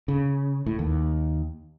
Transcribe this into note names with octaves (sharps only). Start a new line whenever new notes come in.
C#3
A2
D#2